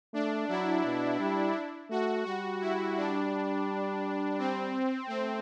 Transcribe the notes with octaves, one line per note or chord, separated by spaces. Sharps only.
A3 D4
F#3 E4
B2
G3
A3 F#4
G3 F#4
E4
D4
C4
A3 C4